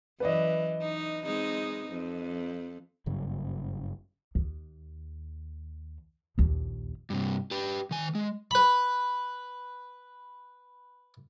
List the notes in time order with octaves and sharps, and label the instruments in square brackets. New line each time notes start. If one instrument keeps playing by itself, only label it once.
[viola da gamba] F#2 E3 [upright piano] B4 D5 D#5
[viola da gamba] D#4
G#3 C4 D#4
F2
[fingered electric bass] F#1 G2 C#3 F#3
[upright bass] D#2
A#1 D#2
[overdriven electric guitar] G2 C3
G4 B4
D#3 G#5
G#3
[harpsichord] B4 B5